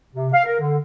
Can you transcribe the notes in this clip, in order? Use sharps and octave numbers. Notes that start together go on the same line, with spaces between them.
C3
F5
A#4
D3